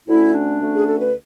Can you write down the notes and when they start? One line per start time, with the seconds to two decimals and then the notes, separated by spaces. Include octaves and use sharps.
0.08 D2 D3 A3 C#4 E4
0.34 D4
0.60 D2 D3 A3 C#4
0.75 G#4
0.87 A4
1.00 B4